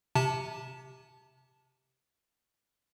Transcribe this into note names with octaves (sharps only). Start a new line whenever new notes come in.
C3 A5